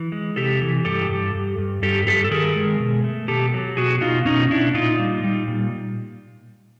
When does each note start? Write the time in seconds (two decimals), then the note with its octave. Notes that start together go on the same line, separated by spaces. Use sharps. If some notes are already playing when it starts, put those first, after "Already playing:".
Already playing: E3
0.12 G#3
0.36 C3 G4 A4
0.62 E3
0.85 G2 G4 A4
1.09 G2
1.35 G2
1.58 G2
1.82 G2 G4 A4
2.07 G2 G4 A4
2.24 A4
2.31 D#3 G#4 A#4
2.56 G#3
2.80 B2
3.04 A3
3.28 B2 G4 A4
3.54 F#3
3.77 B2 F#4 G#4
4.01 B2 D#4 F4
4.26 B2 C#4 D#4
4.50 B2 D4 E4
4.74 A#2 D#4 F4
4.99 G3
5.24 G3
5.48 A#2